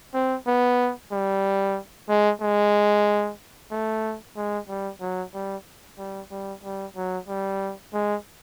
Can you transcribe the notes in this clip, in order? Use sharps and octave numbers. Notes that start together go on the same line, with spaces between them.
C4
B3
G3
G#3
G#3
A3
G#3
G3
F#3
G3
G3
G3
G3
F#3
G3
G#3